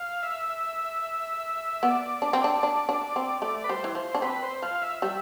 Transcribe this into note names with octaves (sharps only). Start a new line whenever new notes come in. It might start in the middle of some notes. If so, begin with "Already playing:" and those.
Already playing: F5
E5
B3 D5
D4
C4
D4
D4
D4
C4
A3 D5
B4
G3 C5
E3
F3 C5
D4
C4 B4
C5
F3 F5
E5
G3 E5